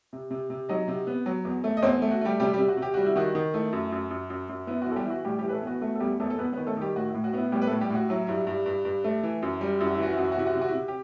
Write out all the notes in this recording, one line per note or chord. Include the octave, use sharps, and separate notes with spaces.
C3
C3
C3
F#3 D#4 D#5
C3
B3
F#3
E2
A3
D#5
E2 C4 C5
A3
F#4
G3 A3 G4
C3 G3 G4
G3 G4
C3
F#4
C3
G4
G3 F#4
E4
D#3 F#4
D#3
A3 E4
F#2
F#2
F#2
F#2
F#2
B3 E4
F#4
E3 A4
G3 G4
E3 E4 F#4
A2 G3 G4
G3 G4
E3
B4
A3 A4
B3 F#4
A3 F#4
A4
E2 G3 G4
E2 A3 A4
A4
E2 B3 B4
B3 B4
D#3
A3 A4
D#3 G3 G4
A2 F#4
E4
A2
F#4
B3 E4
A2 G3 G4
B4
A3 A4
A2
G3 G4
A2 F#4
F#3 E4
G2 E4
G2
G2
G2
A3
E3
F#2
G3
F#2 E4
F#4
E4
E3 F#4
E4
F#2 F#4
E4
F#4
C3 E4
F#4
C3 E4
F#4
E4
C3
G4